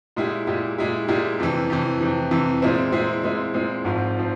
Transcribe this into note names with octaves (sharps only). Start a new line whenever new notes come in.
A#2 G#3 E4 G4
A#2 G#3 E4 G4
A#2 G#3 E4 G4
A#2 G#3 E4 G4
F2 C3 E3
F2 C3 E3
F2 C3 E3
F2 C3 E3
A#2 G#3 C4 E4
A#2 G#3 C4 E4
A#2 G#3 C4 E4
A#2 G#3 C4 E4
G#1 G#2 F3 C4
F3 C4